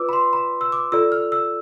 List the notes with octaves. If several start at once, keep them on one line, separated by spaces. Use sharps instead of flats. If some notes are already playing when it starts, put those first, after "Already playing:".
Already playing: F4 B4 D5 D6 E6
B5
C6
B5
E6
D6
F4 A4 D5 E6
F6
E6